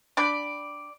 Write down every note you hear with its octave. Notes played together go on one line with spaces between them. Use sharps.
D4 D5 G5 B5